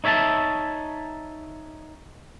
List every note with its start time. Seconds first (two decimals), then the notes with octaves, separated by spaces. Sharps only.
0.04 D#4 C#5 E5 G#5 A5